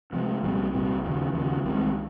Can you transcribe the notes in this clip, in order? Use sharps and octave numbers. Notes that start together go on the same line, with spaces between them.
C3 F3 G#3
C2 A#2 G3 C4
C2 A#2 G3 C4
D#2 C#3 F3
D#2 C#3 F3
C2 C3 D#3 G#3